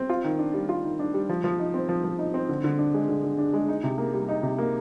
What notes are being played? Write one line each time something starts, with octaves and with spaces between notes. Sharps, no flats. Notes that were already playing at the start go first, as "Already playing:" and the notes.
Already playing: C4
F4
D#3
D4
G3
F4
D#3
D4
G3
F3
F3
D#4
C4
F3
F3
D#4
C4
D3
D3
D4
G#3
D3
D3
D4
G#3
D#4
C3
A#3
G3
D#4
C3
A#3